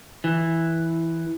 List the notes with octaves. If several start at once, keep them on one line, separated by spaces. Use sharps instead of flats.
E3